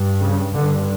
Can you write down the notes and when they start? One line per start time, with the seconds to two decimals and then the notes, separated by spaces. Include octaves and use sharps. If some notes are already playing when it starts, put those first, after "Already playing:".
Already playing: G2
0.20 C#3
0.55 G2 D3